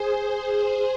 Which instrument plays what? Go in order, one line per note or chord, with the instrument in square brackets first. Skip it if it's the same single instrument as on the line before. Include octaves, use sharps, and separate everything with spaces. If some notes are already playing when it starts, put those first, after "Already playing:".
Already playing: [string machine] G#4 C5